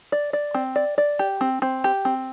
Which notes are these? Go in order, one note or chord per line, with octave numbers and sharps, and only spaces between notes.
D5
D5
C4
D5
D5
G4
C4
C4
G4
C4